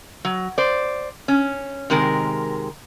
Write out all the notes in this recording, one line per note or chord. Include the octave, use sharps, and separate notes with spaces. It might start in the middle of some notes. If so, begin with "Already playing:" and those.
F#3
C5 D5
C#4
C3 D#3 G#3 A#4